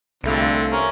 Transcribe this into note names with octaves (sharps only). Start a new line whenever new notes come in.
C2 D3 G3 A3 C4 F4
C#4 A#4